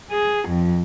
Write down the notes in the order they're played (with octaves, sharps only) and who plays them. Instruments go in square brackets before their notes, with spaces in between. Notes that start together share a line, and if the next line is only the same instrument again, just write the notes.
[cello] G#4
F2